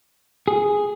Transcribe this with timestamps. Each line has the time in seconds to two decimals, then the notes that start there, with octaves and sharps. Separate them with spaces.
0.48 G#4